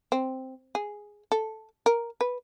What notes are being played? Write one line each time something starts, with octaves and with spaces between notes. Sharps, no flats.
C4
G#4
A4
A#4
B4